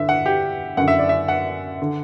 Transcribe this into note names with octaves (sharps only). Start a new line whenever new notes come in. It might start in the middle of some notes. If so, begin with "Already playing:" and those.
Already playing: G2 D3 E5
F#5
G4
F#2 D3 F#5
E5
D5
E5
F#5
D3